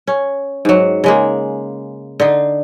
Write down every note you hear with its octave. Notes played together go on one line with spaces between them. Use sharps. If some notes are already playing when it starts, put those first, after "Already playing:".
C#4
G#2 F#3
C#3 G#3 A#3
D3 D#4